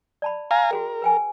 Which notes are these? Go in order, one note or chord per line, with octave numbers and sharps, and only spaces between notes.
D5 A5 B5
F5 G#5 A#5
F#4 G#4 A#4 G5
B4 G5 G#5